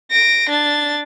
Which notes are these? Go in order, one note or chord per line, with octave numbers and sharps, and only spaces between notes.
A#6 D7
D4 A6